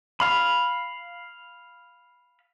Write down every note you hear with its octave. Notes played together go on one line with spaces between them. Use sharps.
F5 B5